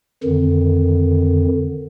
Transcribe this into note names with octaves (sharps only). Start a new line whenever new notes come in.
F2 D3 D#3